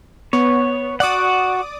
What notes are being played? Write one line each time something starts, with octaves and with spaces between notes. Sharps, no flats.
B3 C#5
F#4 D5 F#5 D6 D#6